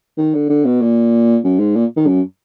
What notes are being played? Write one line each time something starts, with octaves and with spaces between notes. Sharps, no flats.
D#3
D3
D3
B2
A#2
F#2
G#2
A#2
D#3
F#2